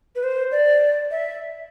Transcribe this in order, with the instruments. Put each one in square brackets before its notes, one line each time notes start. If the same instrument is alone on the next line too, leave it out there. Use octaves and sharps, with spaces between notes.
[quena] B4
C5
D5
E5